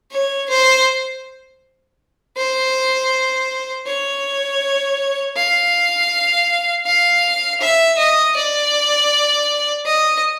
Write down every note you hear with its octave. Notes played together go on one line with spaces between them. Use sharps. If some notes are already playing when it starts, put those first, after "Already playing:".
C#5
C5
C5
C#5
F5
F5
E5
D#5
D5
D#5